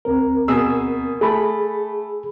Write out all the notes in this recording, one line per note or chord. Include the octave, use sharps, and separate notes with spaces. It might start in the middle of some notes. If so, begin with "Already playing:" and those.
D2 C4 A#4
B2 G#4 E6
A3 G#4 B5